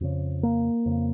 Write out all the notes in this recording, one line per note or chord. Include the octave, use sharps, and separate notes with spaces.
F2 C#3
A#3
F2 C#3